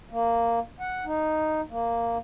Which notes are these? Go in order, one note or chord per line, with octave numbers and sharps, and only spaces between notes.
A#3
F#5
D#4
A#3